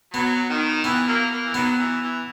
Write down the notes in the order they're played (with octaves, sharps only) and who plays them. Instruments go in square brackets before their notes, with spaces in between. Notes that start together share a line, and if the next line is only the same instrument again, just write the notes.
[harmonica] F#3 [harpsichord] B3
[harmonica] D#3
[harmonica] E3 [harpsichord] B3
[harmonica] F#3 A#3
A#3
E3
[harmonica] D#3 F#3 [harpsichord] B3
[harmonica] E3
E3